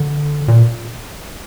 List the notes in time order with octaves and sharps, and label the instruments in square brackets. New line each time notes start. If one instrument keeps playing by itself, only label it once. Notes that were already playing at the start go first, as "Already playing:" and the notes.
Already playing: [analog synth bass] D3
A#2